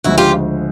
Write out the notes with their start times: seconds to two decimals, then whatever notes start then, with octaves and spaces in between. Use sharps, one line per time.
0.04 D2 C#3 F3 G#3 C#4 E4 F#4
0.18 F4 G4